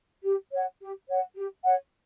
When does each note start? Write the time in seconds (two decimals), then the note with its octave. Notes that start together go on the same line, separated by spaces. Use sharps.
0.24 G4
0.52 C#5 F#5
0.80 G4
1.08 C#5 F#5
1.35 G4
1.63 C#5 F#5